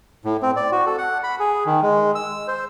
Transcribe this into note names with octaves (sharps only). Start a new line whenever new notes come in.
A2
C4
D5
F#4
A4
F#5
B5
G#4
D#3
G#3
E6
C5